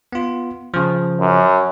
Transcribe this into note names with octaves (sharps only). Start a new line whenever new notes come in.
B3 F4
C#3 F3
F#2